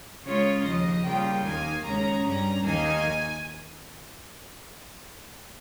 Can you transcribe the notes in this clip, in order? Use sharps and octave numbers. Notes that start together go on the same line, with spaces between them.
C#3 G#3 C#4 F4 C#5
D#2 C#3 F3 D#5
C#3 G3 A#3 F4 G5
D#2 D#3 A#3 G#5
D#2 C#3 G#3 C#4 A#5
G2 G3 C#4 A#5
D#2 D#3 A#3 D#4 G#5